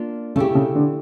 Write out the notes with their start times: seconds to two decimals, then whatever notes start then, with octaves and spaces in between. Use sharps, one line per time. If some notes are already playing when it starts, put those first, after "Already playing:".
Already playing: A#3 D4 F4
0.36 C#3 A3 E4 G4
0.55 C#3
0.75 D3